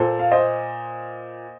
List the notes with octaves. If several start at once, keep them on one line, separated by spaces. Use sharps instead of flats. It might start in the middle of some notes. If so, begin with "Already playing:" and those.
Already playing: A#2 A4 C5
F5
C5 D#5